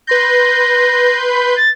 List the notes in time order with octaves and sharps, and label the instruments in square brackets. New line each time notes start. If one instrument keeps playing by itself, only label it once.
[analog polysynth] B4 C6 G6 [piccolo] A#6
[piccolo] B5
A6